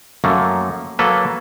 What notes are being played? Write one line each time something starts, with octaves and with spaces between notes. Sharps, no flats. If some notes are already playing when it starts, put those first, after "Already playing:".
F#2 A3 A#3
F#3 A#3 A4 B4